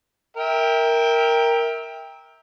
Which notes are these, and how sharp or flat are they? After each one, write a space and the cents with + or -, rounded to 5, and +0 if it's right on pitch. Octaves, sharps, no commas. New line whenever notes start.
A#4 +0 E5 -20 G5 +15